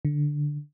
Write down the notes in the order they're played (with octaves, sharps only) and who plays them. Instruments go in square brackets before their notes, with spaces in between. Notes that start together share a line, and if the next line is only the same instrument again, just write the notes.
[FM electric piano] D3